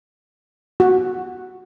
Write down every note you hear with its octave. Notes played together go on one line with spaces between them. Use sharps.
F#4